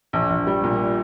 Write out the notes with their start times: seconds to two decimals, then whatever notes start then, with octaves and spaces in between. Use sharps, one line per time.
0.13 A#1
0.30 A#1
0.47 G3
0.64 A#2